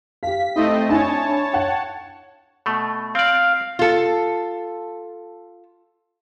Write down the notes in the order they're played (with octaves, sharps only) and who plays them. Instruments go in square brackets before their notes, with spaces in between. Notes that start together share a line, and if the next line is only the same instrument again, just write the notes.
[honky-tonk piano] G4 F5 [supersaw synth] B6
[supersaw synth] A3 C4 D#5 [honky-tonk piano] E4
[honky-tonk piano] D4 E4 G#5 [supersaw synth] C#5 A5
[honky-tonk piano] F#5 G5
[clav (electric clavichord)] B2 A3
[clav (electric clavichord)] C4 D5 [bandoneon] F5
[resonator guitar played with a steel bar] F4 A4